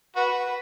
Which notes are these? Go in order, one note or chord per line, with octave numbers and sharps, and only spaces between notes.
F#4 B4